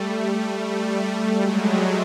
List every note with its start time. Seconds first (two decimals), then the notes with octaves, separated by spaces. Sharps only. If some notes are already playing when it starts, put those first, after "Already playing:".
Already playing: G3 A3
0.64 G3 A3
1.38 F#3 G#3